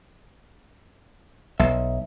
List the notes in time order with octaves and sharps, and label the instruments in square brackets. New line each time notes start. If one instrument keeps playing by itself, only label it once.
[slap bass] B1 [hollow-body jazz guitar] E5